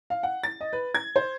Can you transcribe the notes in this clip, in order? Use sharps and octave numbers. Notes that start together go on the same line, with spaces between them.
F5
F#5
A6
D#5
B4
G#6
C5